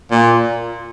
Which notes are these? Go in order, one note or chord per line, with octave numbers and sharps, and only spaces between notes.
A#2